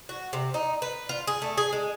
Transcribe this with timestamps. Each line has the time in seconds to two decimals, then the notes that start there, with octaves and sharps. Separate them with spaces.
0.09 F#4
0.33 C3
0.54 D#4
0.82 B4
1.09 F4
1.27 G#4
1.42 A3
1.58 G#4
1.73 G#3